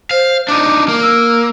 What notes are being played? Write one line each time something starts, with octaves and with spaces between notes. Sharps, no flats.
C5 F5
D4 D#4 D6
A#3
E6